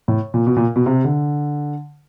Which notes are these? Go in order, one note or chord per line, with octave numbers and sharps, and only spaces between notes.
A2
A#2
B2
A#2
B2
C3
D3